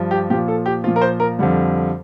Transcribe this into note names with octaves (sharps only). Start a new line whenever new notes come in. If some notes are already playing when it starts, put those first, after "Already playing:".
Already playing: G2 F3
G4
A#2 F3 G4
A4
G4
A#2 F3 F4
A#4
C5
A#4
F2 D3 G3